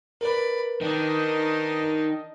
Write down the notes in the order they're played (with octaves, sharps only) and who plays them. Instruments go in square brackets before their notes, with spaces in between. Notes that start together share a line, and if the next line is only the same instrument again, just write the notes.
[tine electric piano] A#4 B4 [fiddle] D5 B5
[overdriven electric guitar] D#3 [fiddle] D4 D#4 [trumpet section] D#5